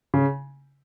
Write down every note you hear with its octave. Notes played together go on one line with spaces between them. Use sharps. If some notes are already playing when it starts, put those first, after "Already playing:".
C#3